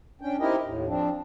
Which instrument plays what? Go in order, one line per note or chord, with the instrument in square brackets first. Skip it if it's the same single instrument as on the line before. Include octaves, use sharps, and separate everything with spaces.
[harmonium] C#4 D4 G5
C4 D#4 E4 G4 A#4 D#5
D#2 A2
F3 C4 D4